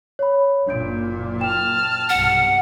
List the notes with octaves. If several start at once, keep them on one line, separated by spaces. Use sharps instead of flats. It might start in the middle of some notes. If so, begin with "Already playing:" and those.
C#5 B5
F#1 A#2 D4 G6 D7
G5 A5 F6 E7
B1 G2 C3 F#5